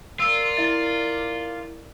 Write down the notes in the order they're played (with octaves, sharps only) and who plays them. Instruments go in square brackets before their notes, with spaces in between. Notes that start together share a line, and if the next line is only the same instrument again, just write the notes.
[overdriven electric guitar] F4 [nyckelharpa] A#4 D5 [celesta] E6
[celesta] E4 E5 A6